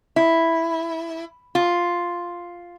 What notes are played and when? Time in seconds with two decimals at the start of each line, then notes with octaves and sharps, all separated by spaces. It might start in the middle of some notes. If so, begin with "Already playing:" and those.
0.16 E4
1.55 F4